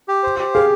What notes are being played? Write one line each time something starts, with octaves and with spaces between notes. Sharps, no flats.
G4
C5
G4
G#4 F5